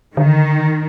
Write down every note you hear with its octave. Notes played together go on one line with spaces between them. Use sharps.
D3 D#3